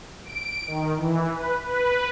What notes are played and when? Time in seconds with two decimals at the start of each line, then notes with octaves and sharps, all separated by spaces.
0.25 D7
0.67 D#3
0.97 E3
1.32 B4
1.65 B4